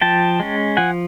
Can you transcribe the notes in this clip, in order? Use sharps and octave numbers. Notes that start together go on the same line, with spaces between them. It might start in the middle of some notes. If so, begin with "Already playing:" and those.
F3 G5 A5
G#3 C#4
F3 F#5 G#5